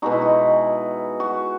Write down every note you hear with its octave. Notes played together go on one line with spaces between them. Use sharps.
B2 G#3 D#4 F#4
E4
F#4
F#4